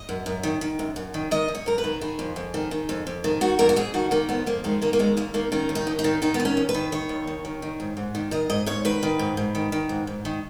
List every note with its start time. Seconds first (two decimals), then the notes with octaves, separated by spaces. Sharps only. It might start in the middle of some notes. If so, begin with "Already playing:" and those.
Already playing: D#5
0.09 F#2
0.26 F#2
0.43 D#3
0.61 D#3
0.79 F#2
0.96 F#2
1.14 D#3
1.31 D#3 D#5
1.48 F#2
1.55 C#5
1.66 F#2 A#4
1.78 B4
1.84 D#3
2.01 D#3 G#4
2.19 F2
2.36 F2
2.54 D#3
2.71 D#3
2.89 F2
3.07 F2
3.24 D#3
3.41 D#3 F#4
3.59 F2 A#4
3.69 F#4
3.76 F2 G#4
3.94 D#3 F#4
4.11 D#3 A#3
4.29 F2 B3
4.46 F2 A#3
4.64 D#3 G#3
4.82 D#3 A#3
4.93 A#3
4.99 D#2 G#3
5.17 D#2 A#3
5.34 D#3 A#3
5.52 D#3 C#4
5.69 D#2
5.75 D#4
5.87 D#2
5.99 D#4
6.04 D#3
6.22 D#3 D#4
6.34 B3
6.40 D#2
6.45 C#4
6.57 D#2
6.69 B4
6.74 D#3
6.92 D#3 C#5
7.09 D#2
7.27 D#2
7.45 D#3
7.62 D#3
7.80 G#2
7.97 G#2
8.15 D#3
8.31 D#3 D#5
8.50 G#2 D#5
8.66 G#2 C#5
8.85 D#3 B4
9.03 D#3
9.19 G#2
9.37 G#2
9.55 D#3
9.72 D#3
9.89 G#2
10.07 G#2
10.25 D#3